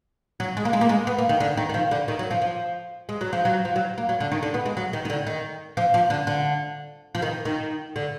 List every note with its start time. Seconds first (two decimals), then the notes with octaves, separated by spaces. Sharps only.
0.40 F#3
0.57 G#3
0.65 A#3
0.73 G#3
0.81 A#3
0.89 G#3
1.07 B3
1.18 A#3
1.29 D#3
1.40 D3
1.57 D#3
1.69 D#3
1.74 F3
1.91 D3
2.08 D#3
2.19 F#3
2.31 F3
2.42 F3
3.09 G#3
3.21 F#3
3.33 F3
3.45 F#3
3.65 F3
3.76 F#3
3.98 A#3
4.09 F#3
4.20 D3
4.32 D#3
4.43 D3
4.54 B3
4.66 G#3
4.77 F#3
4.93 D#3
5.05 D#3
5.10 D3
5.27 D#3
5.77 F3
5.94 F3
6.10 D3
6.27 D3
7.15 F3
7.22 D#3
7.45 D#3
7.96 D3